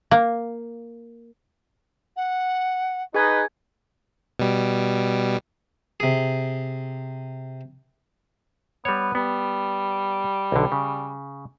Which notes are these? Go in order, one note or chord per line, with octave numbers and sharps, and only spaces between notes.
A#3
F#5
D#4 G#4 B4 G#5 G#6
B2 G3
C3 G#4
G3 B3 C#5
G3 B3
B1 D3
C#3